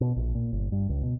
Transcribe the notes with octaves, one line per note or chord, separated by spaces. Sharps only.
B2
A#1
A#2
G1
G2
C#2
B2